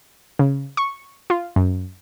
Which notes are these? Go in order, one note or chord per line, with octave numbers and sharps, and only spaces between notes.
C#3
C#6
F4
F#2